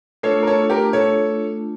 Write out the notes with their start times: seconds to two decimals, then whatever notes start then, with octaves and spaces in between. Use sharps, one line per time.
0.23 A3 D4 F4 A4 C#5
0.43 A#4
0.47 A4 C#5
0.70 G4 A#4
0.93 A4 C#5